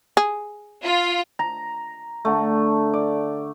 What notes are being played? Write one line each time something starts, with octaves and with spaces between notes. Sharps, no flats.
G#4
F4
A#5
D3 A3
D5